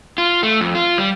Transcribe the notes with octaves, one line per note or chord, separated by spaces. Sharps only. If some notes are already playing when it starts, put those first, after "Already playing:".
F4
A3
F2
F4
G3